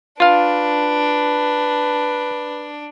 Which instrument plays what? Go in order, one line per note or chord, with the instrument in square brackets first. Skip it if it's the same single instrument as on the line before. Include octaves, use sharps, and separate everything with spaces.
[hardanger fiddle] D4 [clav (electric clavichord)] F4 F5 [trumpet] B4